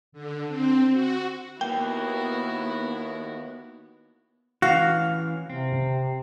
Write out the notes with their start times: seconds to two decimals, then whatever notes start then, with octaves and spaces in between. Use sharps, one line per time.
0.12 D3
0.48 C4
0.92 F#4
1.61 D#3 A#3 B3 E4 F#4 G5
4.62 E3 C#4 F#4 F5
5.49 C3 C4